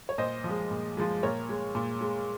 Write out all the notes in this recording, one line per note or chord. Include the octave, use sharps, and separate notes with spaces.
C#5
A#2 C5 D#5
F3
G#3
A#2
F3 G#3
A#2 A#4 C#5
G#3
A#2
G#3